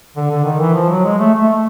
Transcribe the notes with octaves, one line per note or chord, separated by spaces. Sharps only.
D3
D3
D#3
E3
F3
F#3
G#3
A3
A3
A3